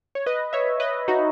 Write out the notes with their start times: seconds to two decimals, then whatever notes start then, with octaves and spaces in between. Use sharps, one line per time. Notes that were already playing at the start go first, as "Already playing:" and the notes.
0.15 C#5
0.26 B4 D#5
0.53 C#5 E5
0.80 B4 D#5
1.08 D#4 F#4